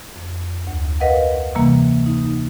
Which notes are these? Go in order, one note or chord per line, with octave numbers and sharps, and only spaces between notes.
F2
D2
A#4 B4 D#5 F5 F#5
C3 E3 G3 A#3
D#4